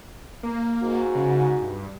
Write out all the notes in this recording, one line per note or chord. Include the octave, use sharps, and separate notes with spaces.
A#3
G#2 F#4
C#3
G2